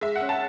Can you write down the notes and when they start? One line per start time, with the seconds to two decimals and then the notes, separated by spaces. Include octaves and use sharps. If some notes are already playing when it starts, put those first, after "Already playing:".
0.01 G#3 E5
0.16 C#4 F#5
0.29 A5